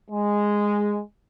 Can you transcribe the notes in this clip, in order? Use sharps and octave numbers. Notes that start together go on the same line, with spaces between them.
G#3